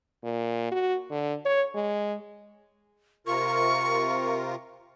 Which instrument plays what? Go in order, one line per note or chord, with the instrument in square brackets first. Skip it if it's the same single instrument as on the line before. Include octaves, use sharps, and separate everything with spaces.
[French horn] A#2
F#4
D3
C#5
G#3
[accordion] C3 F4 A#4 [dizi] C#6